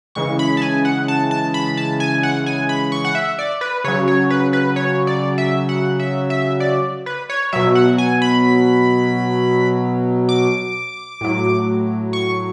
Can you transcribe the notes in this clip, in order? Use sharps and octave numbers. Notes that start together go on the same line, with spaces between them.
C#3 E3 G#3 C#6
B5
A5
G#5
F#5
A5
A5
B5
A5
G#5
F#5
G#5
B5
C#6
F#5
E5
D5
B4
C#3 F#3 C#5
C#5
B4
B4
C#5
D5
E5
F#5
E5
E5
D5
B4
C#5
B2 F#3 E5
F#5
G#5
B5
D6
A2 F#3
C#6